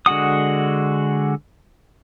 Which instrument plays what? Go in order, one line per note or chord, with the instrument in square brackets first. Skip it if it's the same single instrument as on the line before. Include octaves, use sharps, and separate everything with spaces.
[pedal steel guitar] D3 G#3 F#4 F#5 D#6